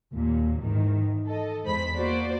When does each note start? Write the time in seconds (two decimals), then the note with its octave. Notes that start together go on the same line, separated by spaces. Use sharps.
0.13 D#2 A#2
0.60 G#2 D#3 E3
1.26 A4 D#5
1.64 E2 G#3 C5 B5 B6
1.95 A#3 F#4 C5 D5